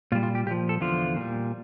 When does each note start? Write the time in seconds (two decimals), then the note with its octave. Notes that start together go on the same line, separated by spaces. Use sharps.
0.12 A#2 F4
0.15 G3
0.23 F4
0.35 G4
0.46 A#2 G4
0.51 F3
0.69 A4
0.81 E2 D3 F3 F4
1.16 A#2 G3